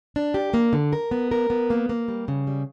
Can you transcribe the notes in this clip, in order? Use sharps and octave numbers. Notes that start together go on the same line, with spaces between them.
D4
G4
A#3
D3
A#4
B3
A#4
B3
A#3
A#3
G3
C#3
G3